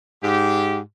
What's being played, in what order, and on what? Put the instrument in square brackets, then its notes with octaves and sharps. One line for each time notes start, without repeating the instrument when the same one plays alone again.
[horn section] G#2 G4